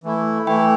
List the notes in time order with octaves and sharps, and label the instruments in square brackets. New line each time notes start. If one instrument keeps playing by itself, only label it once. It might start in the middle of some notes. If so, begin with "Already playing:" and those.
[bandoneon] E3 A3 E4
[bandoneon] E3 A3 E4 [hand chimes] G5 B5